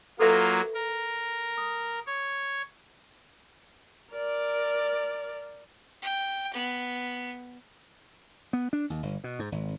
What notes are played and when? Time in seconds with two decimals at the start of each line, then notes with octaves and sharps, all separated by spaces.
0.19 F#3 A#3 F4 A4 B4 E5
0.74 A#4
1.58 D#6
2.07 C#5
4.12 A#4 D5
6.02 G5
6.54 B3
8.53 B3
8.73 D4
8.90 D#2
9.03 G1
9.24 B2
9.39 G#2
9.52 G#1